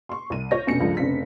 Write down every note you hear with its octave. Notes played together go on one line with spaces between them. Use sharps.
C6 C#6
C2 D#7
F4 C#5 G6 A#6
F1 B2 C#4 D4 A#6 C#7
C#2 G2 F3 A3
F1 C#3 C4 D4 B6